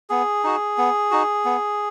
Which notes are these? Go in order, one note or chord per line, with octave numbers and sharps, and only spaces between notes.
B3 G#4
D#4 F#4
B3
D#4 F#4
B3